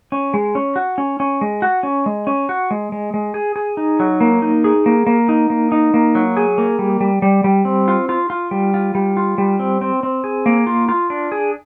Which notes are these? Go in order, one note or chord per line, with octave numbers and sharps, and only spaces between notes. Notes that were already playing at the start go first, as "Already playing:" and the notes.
C#4
G#3
C#4
F#4
C#4
C#4
G#3
F#4
C#4
G#3
C#4
F#4
G#3
G#3
G#3
G#4
G#4
D#4
F#3
A#3
D#4
G#4
A#3
A#3
D#4
A#3
D#4
A#3
F#3
G#4
A#3
G3
G3
G3
G3
C4
F4
F4
F4
G3
F4
G3
F4
G3
C4
C4
C4
G#4
A#3
F4
F4
D4
G#4